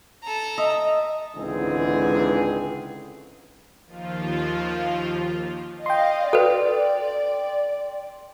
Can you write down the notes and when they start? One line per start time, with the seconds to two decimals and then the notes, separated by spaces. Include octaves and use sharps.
0.23 A4 A#5
0.58 D#5 E5
1.36 C#2 G#2 D3 E3 C4 G#4
3.86 D#2 F3 F4
5.86 D#5 F5 G5 C6
6.33 A4 B4 D5